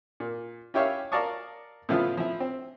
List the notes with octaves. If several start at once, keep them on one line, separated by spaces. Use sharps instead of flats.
A#2
C#4 E4 G4 C#5 E5 F5
A#4 D5 F5 A5 C#6 D#6
A2 C#3 F3 B3 E4 F4
F3 E4
C4